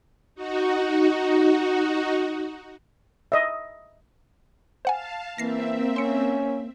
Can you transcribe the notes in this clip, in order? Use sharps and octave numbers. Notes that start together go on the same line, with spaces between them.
D#4 F#4
D#5 E5
C5 F5 F#5 G#5 A5
E3 A#3 C4 E5 A#6 C7
C#4 C6 C#7